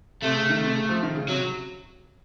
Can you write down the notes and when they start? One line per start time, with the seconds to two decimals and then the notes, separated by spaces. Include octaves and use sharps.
0.22 C3 A3
0.36 C#3
0.50 D#3
0.62 C3
0.75 C#3
0.89 F3
1.03 D#3
1.15 C#3
1.29 C3 F#3